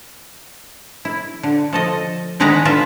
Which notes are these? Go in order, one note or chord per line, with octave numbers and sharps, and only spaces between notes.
E4
D3
F3 A4 D#5
D3 D#3 G#3 B4 F#5 A#5
D3 F4 B4 E5